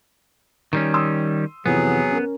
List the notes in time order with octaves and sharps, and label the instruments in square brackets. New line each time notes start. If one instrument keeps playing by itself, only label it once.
[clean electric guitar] D#3 G3 C#4
[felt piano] C6 D#6 E6
[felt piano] F2 C3 E3 [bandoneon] F#3 G#4 [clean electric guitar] B3
[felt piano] C#4 A#4